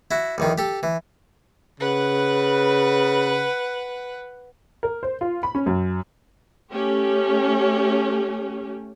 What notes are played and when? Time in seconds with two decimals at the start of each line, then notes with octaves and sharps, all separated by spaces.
0.11 E4 F#4
0.38 B1 E2 D#3
0.58 G4 A4
0.83 E3
1.80 C#3 B4 F#5
4.83 A#4
5.03 C5
5.21 F4
5.43 B5
5.55 C#4
5.66 F#2
6.72 A3 C#4 G4